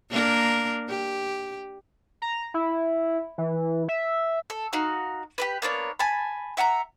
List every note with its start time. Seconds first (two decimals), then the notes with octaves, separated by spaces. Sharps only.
0.10 A#3 D4 A#4
0.89 G4
2.22 A#5
2.54 E4
3.38 E3
3.89 E5
4.50 A4
4.73 D#4 F#4 F5
5.38 G4 A#4 B4
5.62 A#3 B3 D4 C#5
5.99 G#5 A5 B5
6.57 E5 F#5 A5 A#5